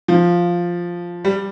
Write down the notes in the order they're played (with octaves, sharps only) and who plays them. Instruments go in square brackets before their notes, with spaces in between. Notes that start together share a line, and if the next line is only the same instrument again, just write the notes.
[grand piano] F3
G3